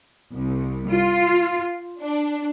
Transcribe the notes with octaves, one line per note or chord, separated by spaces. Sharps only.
C2
F4
D4